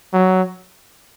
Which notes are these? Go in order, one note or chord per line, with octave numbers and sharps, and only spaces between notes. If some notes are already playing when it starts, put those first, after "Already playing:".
F#3